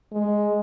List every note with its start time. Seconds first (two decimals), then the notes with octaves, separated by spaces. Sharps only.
0.13 G#3